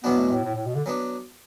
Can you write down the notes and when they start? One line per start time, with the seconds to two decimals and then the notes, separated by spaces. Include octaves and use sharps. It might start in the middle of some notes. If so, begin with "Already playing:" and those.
0.04 E2 B2 F#3 B3 D4 F#4
0.18 A3
0.31 A2
0.44 A2
0.55 A2
0.66 B2
0.75 D3
0.86 F#3 B3 D4